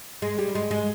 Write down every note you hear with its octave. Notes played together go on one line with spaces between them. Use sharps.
G#3
G3
G#3
G#3